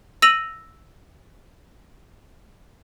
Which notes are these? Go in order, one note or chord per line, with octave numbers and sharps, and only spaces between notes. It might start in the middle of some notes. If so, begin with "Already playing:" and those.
E6 A#6 D#7 F7 F#7